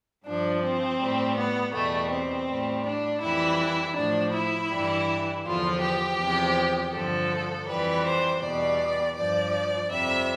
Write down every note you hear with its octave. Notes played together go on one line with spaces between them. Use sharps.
G2 F3 D4
C4
A2 G3
B3
E2 B2 G3 A3
C4
A2 G3
D4
F2 E3 G3 E4
A2 F3 D4
E4
G2 E3 G3
E2 D3 F3 F4
G4
E2 C3 F3
G2 D3 F3 A4
F2 E3 G3 B4
C5
E2 B2 G3 D5
G2 F3 D5
F2 C3 G3 E5